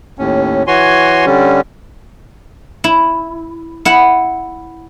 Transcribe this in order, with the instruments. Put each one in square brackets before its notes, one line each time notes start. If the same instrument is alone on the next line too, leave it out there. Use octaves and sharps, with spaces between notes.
[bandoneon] D#2 A2 C#4
E3 F#4 C#5 G#5 C6
D3 G3 C#4
[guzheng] E4
E4 F#5